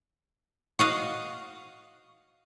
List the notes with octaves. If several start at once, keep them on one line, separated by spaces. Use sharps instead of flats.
F#4 D#5 F5